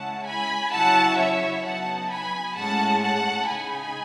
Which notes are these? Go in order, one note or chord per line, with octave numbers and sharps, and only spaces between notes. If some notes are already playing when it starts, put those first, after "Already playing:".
Already playing: C#3 G#3 C#4 E4 F#5 A5
G#5 B5
C#3 F#3 C#4 E4 F#5 A5
C#5 E5
C#3 F#3 B3 D#4 F#5 A5
G#5 B5
A2 G#3 C#4 F#5 A5
F#5 A5
C#3 G#3 D#4 G#5 B5